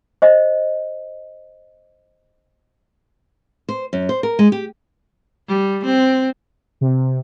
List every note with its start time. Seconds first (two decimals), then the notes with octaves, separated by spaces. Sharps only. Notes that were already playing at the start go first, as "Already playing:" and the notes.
0.22 C5 D#5
3.69 C5
3.93 F#2
4.09 C5
4.23 A#4
4.39 G#3
4.52 G4
5.48 G3
5.85 C4
6.81 C3